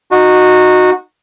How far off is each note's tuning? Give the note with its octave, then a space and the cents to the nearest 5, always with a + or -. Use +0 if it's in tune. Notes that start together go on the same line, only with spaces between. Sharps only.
D#4 -15 F#4 -15